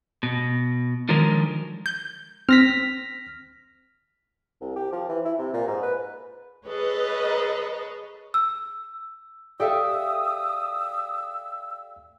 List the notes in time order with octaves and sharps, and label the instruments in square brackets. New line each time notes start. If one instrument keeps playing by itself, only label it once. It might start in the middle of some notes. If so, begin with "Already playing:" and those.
[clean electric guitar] B2
D3 D#3 F3 F#3 G#3 A#4
[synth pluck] G6
[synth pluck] C4 [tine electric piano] F6 A#6 B6
[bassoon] C2
G4
F3
E3
E4
C3
A#2
G#2
B4
[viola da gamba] G#4 A4 C#5 [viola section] B4 D#5
[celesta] E6
[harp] G4 A4 E5 [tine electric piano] D5 F5 G5 [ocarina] D#6 [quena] E6